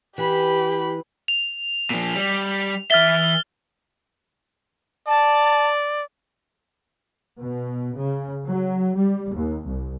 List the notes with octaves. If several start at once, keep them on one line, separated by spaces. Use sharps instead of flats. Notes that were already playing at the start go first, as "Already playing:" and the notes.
E3 G4 B5
F7
A#2 F3
G3
E3 E5 F6 A6 G7
D5 A5
B2
C#3
F#3
G3
D#2
C2